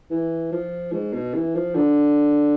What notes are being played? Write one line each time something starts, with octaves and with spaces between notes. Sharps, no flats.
E3
F3
G#2
B2
E3
F3
D3